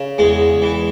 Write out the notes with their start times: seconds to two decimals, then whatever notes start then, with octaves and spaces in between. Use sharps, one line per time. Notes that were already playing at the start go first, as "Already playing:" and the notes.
Already playing: C#3
0.18 E2 G#3
0.62 E3